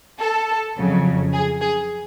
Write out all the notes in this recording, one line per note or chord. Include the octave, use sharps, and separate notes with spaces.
A4
F2 C#3 F#3
G#4
G#4